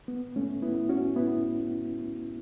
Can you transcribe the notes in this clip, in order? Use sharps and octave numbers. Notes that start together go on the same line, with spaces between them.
B3
A3 C#4
B3 E4
C#4 F#4
B3 E4